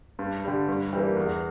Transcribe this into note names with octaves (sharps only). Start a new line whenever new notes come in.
G2
D3 G3
G2
E3 G3 A#3
E2